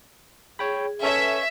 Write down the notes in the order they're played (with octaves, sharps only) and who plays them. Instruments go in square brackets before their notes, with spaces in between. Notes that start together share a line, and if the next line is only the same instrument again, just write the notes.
[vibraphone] G#4 [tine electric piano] C#5 G5 B5
[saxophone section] C#4 [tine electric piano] A4 [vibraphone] B4 C#5 [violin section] E5